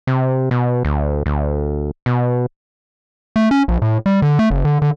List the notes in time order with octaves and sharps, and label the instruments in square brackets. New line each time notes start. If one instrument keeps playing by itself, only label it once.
[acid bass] C3
B2
D2
D2
B2
[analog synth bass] A3
C#4
A#1
A2
G3
D3
A3
F#1
D3
D3